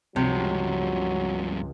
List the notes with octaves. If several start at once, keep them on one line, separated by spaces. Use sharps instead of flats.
C#2 G2 C3 F3 F#3